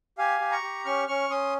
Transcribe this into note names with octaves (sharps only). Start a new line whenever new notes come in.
G4 F5 G#5
G4
A#5 C#6
G4
C#4 C#6 F6
C#4 C#6 F6
C#4 C6 D#6